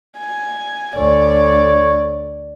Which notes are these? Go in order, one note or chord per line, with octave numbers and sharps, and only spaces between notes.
G#5
D2 C#5 D5